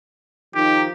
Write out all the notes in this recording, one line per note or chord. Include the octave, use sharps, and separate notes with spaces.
D#3 F3 D#4 G4